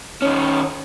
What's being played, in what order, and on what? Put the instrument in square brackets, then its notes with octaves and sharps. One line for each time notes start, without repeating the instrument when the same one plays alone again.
[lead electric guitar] D#3 C#4